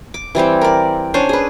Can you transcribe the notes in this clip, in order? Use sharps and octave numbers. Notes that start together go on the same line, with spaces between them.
D6
E3 G3 C4 G4
A#4 D5
C#4 D4 C5
G#4 B4